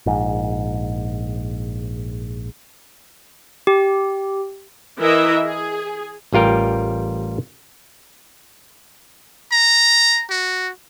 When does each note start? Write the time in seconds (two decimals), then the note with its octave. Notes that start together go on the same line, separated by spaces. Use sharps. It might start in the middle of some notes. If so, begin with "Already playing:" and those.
0.06 A#1 G#2
3.67 G4
5.01 E3 E4 A#4 D#5 E5
5.44 G#4
6.33 A1 G3 F4 A#4 G5
9.52 A#5
10.30 F#4